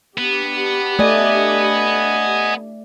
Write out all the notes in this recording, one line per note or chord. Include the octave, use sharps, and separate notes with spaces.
B3 D4 G4
A3 D5 D#5 G#5